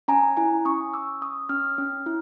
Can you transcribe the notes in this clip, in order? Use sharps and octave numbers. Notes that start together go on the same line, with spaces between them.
C#4 G#5 A#5
E4 G#5 A#5
C#4 C#6 D#6
C#4 D6 E6
C#4 C#6 D#6
C#4 D#6 F6
C#4
E4